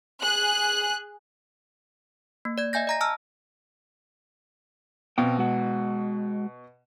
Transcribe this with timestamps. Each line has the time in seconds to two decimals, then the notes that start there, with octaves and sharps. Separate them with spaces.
0.22 G#4 F#6
2.45 A#3
2.58 D5 G#6
2.73 D#5 E5 G#5 G6 A#6
2.87 D#5 A#5 A#6
3.01 A5 A#5 E6 F6
5.18 B2 C4 F5 G5
5.38 G#3 F#4 F#5